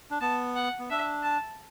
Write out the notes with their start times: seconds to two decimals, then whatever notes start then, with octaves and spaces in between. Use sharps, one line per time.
0.11 D4
0.21 B3 A5
0.56 F#5
0.79 B3
0.90 D4 E5
1.23 A5